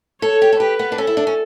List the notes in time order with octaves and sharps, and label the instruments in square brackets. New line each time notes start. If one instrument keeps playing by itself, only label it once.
[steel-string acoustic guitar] A4 [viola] C#5
[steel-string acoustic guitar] G4
A4
[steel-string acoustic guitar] G4 [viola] B4
[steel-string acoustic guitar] B3
D4
[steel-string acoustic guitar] C#4 [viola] A4
[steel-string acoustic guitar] E4
D4
C#4